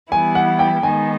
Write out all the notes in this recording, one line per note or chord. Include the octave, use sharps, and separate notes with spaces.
E3 G3 B3 E4 G#5
F#5
G5
D#3 G#3 B3 D#4 G#5